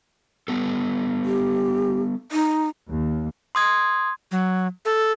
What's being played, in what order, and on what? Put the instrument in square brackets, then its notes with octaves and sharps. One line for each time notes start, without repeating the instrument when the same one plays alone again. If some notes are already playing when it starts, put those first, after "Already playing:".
[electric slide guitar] G3 B3 A4
[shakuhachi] G4
D#4
[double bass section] D#2
[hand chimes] C6 D#6 G#6
[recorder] F#3
A4